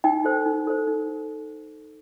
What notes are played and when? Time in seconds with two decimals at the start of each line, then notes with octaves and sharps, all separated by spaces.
0.04 D#4 G5
0.25 A4 C5
0.46 D#4
0.67 A4 C5
0.87 D#4